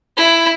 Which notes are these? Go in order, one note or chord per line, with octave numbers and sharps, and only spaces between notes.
E4